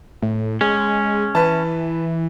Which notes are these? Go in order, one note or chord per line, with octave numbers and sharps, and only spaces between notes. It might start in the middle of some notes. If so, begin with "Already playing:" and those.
A2
G#3 C#4
E3 B4 A5